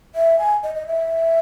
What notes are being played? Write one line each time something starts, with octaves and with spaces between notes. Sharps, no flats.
E5
G#5
D#5
D#5
E5